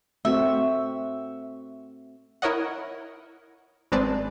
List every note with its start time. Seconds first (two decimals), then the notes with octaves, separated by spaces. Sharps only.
0.25 A3 C4 F#4 E5
2.42 E4 A#4 C#5 D#5 F#5
3.92 G#1 G#3 C4 B4 D5 A5